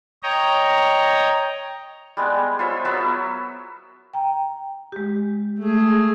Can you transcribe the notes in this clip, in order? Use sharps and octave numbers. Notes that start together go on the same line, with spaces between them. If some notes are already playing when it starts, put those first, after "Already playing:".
C#5 D#5 G5 A#5
G3 G#3 B3
F4 C5 C#5 E5
F#3 B3 A#4 E5
G5 A#5
G#3 G4
A3 G#4